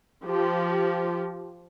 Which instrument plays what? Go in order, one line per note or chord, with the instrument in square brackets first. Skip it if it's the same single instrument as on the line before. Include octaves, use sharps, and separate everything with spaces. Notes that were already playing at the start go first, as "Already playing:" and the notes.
[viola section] F3 G4